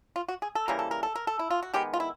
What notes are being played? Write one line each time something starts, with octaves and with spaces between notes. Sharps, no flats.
F4
F#4
G#4
A4
C#3 E3 G3 A#3 A#4
A4
A#4
A4
A#4
A4
E4
F4
F#4
D#3 G#3 B3 G4
F4
E4